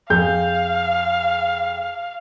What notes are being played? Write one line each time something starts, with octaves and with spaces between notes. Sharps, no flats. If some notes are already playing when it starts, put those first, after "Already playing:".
F2 G#4 F5 G6